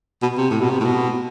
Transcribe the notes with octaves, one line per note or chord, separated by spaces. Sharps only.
B2
C3
A2
B2
C3
A2
B2